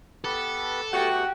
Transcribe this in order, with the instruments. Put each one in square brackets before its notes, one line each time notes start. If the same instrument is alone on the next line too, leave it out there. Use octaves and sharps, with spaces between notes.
[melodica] B3 G4 B4 [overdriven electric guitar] A4
[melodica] A3 B3 [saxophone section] F#4 [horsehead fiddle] G4